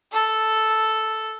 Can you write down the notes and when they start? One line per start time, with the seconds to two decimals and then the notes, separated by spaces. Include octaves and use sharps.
0.12 A4